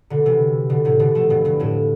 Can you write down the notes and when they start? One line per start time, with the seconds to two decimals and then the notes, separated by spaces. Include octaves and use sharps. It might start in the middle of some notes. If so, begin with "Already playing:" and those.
0.10 B2 D3
0.26 C3 E3
0.70 B2 D3
0.85 A2 C3
0.99 B2 D3
1.15 F3 A3
1.30 G2 B2
1.45 G2 B2
1.59 F2 A2